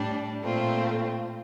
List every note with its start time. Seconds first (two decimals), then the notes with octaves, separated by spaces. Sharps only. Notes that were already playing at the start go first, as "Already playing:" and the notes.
Already playing: A2 G3 D4
0.43 A#2 A3 C4 F4